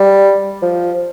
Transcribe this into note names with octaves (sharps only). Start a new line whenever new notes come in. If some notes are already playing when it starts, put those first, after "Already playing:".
Already playing: G3
F3